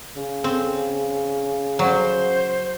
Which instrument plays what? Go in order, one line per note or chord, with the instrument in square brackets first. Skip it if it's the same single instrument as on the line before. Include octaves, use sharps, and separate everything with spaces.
[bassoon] C#3
[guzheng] C4
[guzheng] F#3 [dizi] C5